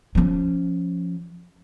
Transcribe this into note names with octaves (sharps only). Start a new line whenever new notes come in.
F3 C#4